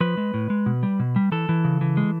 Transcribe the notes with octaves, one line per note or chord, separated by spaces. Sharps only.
F3 B4
G#3
A2
G#3
B2
G3
B2
G3
E3 A4
E3
C#3
E3
G#3